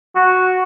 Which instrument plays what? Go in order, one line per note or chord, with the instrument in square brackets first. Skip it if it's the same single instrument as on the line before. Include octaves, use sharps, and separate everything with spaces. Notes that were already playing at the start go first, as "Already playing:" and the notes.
[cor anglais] F#4